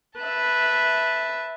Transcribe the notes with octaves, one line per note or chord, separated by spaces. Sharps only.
B4 E5 A5